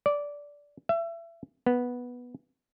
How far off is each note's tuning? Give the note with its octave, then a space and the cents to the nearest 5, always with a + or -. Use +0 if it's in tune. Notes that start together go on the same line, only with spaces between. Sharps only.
D5 -15
E5 +30
B3 -5